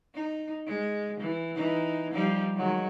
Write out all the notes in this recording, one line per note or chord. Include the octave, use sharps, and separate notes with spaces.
D#4
G#3
E3
E3 D#4
F3 G3 D#4
D#3 F#3 G#3